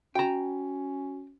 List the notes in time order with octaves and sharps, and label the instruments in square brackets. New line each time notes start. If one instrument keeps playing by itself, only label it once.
[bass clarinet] C#4 [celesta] F#4 [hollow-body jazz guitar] G5 A#5